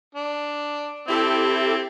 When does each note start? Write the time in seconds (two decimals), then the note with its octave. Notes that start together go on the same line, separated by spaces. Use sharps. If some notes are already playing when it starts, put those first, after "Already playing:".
0.15 D4
1.08 C4 E4 G4 A4